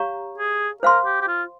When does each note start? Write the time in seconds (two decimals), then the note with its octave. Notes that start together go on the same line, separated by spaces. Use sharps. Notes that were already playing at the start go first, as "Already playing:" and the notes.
Already playing: G4 C#5 F5 A#5 C#6
0.38 G#4
0.83 A#4 C5 F5 C6
1.05 G4
1.21 G4
1.28 F4